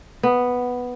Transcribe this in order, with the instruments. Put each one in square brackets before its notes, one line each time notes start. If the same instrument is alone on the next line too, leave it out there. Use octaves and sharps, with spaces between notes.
[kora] B3